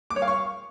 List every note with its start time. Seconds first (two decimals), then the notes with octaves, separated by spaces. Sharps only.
0.10 D6
0.16 C#5
0.22 F5
0.28 C#6